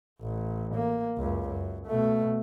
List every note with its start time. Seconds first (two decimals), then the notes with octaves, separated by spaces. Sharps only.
0.21 A1
0.74 A#3
1.18 C#2 F#2
1.48 F#2
1.86 B2 A3